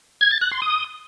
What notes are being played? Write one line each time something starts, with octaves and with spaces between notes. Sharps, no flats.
G#6
A6
F#6
C6
D#6